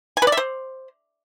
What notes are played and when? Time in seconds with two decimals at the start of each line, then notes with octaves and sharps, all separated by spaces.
0.17 G#5
0.22 B4
0.27 D5
0.32 E5
0.37 C5